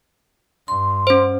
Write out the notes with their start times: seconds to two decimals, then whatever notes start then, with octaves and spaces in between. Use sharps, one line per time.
0.68 G2 C6
1.07 C#4 C5